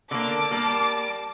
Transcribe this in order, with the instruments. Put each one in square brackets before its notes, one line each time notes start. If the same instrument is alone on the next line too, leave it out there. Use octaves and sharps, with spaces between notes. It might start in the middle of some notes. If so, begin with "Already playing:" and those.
[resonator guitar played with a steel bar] D3 A#3 [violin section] A5 D6
[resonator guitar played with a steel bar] G3 A#3